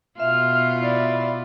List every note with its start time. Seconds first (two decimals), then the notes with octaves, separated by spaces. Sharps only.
0.20 B2 F4 E5 F6
0.79 E4 D5